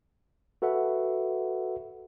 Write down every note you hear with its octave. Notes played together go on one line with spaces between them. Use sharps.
F#4 A4 B4 E5 F#5